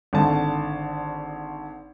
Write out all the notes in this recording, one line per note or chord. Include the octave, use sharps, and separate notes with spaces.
G#1 D3 A5